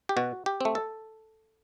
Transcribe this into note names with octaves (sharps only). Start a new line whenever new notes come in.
G4
B2 F#4
G4
A3 C4
A4